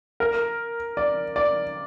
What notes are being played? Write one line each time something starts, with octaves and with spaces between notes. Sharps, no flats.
A#4
D5
D5